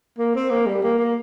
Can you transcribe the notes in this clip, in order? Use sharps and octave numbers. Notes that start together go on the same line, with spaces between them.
A#3
C4
A#3
G3
A#3
A#3